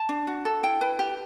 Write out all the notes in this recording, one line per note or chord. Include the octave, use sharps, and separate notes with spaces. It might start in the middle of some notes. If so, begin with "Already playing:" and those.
Already playing: A5
D4
F#4
A4
E4 G5
B4
G4